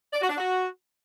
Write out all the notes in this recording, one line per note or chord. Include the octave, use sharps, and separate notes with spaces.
D5
F#4
D4
F#4